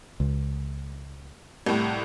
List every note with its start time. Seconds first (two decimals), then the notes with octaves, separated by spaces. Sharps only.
0.20 C#2
1.66 C2 A2